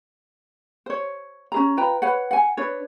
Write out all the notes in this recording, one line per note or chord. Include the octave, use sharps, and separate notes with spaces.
C5 C#5
C#4 G#4 A#5
F4 B4 G5 A#5
B4 C#5 F#5
F#5 G#5
D4 B4 C#5